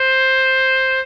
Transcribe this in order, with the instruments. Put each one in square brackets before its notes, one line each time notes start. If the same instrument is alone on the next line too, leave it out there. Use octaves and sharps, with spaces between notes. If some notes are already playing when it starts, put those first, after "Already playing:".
Already playing: [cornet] C5